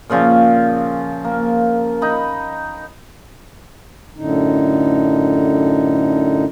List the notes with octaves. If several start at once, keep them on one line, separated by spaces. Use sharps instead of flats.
A#2 C#3 F3 C#4
A#3
D#4 B5
F#2 A2 D3 D#4